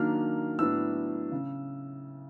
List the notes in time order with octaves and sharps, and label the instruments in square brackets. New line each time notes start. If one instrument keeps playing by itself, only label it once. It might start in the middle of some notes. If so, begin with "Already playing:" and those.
Already playing: [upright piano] D#3 F#3 A#3 D4 F6
A2 F#3 B3 D4 E6
C#3